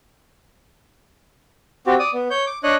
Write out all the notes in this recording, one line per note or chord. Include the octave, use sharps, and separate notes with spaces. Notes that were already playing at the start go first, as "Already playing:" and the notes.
C4 F#4 G4
D5 D#6
B3
C#5 G6
D6
D4 C#5 D#5 F#6